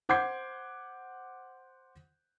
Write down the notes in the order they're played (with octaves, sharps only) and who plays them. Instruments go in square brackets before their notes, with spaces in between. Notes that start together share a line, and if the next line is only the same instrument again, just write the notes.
[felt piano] C5 F#5 D6 G6 G#6 C7